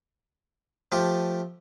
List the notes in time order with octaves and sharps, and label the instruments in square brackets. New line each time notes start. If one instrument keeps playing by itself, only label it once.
[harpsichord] F3 A3 G4